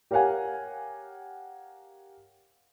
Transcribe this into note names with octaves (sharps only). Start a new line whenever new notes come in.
G4 A#4 C#5 F5 F#5 G#5